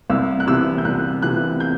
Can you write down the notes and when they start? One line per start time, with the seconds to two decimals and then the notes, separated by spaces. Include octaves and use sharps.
0.10 C2 E6
0.40 F#6
0.47 C3 E3 E6
0.78 G6
0.85 C2 F#6
1.22 C3 E3 F#6
1.60 G6